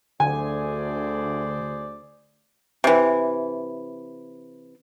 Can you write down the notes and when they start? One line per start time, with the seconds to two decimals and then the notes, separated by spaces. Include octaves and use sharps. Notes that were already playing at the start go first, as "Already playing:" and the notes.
0.20 D2 D3 G#4 C5 D5 G#5
2.84 C3 E3